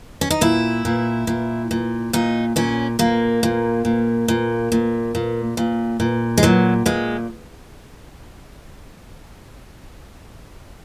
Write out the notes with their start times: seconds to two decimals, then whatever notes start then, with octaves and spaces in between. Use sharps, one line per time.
0.21 C#4
0.30 D#4
0.41 A#2 E4
0.85 A#2
1.27 A#2
1.71 A#2
2.13 A#2 D#4
2.56 A#2 C#4
2.99 A#2 A#3
3.43 A#2
3.85 A#2
4.28 A#2
4.72 A#2
5.15 A#2
5.57 A#2
6.00 A#2
6.38 G#3
6.43 A#2 F#3
6.86 A#2 G#3